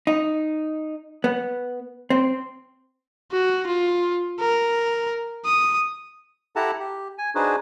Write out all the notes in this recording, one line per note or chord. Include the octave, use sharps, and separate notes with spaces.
D#4
B3
C4
F#4
F4
A#4
D#6
E4 G4 A4 F#5 A5 A#5
G4
G#5
D4 D#4 F#4 G#4 B4 C5